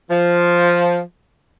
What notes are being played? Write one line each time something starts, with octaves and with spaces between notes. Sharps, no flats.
F3